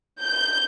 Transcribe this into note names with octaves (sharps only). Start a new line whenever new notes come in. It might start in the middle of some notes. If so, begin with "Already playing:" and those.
G6